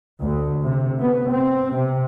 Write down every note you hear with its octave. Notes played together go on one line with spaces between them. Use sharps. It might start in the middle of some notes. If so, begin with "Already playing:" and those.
D2
C3
B3
C4
C3